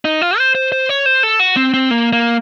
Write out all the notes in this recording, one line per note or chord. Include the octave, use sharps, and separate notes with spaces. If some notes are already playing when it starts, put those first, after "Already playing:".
D#4
F4
C5
C5
C5
C#5
C5
A4
F#4
C4
C4
A#3
A#3